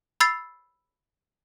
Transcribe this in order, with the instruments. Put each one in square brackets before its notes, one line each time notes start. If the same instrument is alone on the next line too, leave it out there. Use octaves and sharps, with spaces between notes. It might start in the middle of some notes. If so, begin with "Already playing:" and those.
[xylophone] B5 E6 G#6 A6 C7